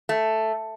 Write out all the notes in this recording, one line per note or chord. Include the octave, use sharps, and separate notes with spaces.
A3